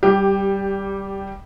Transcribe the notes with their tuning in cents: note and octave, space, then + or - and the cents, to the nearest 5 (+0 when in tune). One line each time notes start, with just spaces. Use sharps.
G3 -10 G4 +10